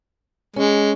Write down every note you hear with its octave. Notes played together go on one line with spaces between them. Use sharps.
G#3 C#4